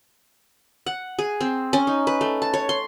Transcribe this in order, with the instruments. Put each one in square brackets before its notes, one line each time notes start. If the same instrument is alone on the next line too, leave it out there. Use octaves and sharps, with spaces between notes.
[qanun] F#5
G#4
C4
C#4
D#4
B4
A3
A5
C#5
C6